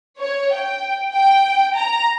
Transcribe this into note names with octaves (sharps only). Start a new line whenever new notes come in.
C#5
G5
G5
A#5